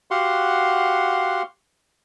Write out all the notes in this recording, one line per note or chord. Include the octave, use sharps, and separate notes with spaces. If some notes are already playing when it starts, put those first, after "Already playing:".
F#4 G4 F5 F#5 C6